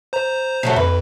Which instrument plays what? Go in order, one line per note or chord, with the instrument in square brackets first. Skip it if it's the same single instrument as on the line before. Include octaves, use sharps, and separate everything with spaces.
[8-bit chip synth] C5 A#5
[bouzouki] C#3 F#3 A3
[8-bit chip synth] F2 [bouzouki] B4